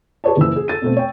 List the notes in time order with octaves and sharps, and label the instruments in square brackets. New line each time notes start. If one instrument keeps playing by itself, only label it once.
[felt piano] G4 G#4 B4 C#5 D5 A5
F#1 E3 E6
G#4
A4 A6 D#7
B2 A3 C4
C#5 G5